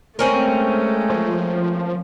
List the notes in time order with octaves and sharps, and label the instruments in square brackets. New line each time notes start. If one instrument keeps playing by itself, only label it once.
[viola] G#3 A3 [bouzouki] C4 C#4 A#4
[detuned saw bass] F3